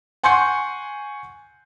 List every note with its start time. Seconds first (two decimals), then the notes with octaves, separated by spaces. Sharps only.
0.23 F#5 G#5 C6 C#6 G6 C#7